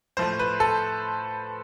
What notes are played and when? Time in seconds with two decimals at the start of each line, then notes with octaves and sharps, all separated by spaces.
0.17 A2 F3 A3 C5
0.39 B4
0.60 A4